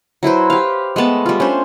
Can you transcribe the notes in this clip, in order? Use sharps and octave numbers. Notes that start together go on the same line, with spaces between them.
F#3 E4 B4 C5
G4 F5
G#3 A3 B3 A5
G3 F4
C#4 D4 C5